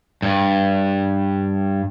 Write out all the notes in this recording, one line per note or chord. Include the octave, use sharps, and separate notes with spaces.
G2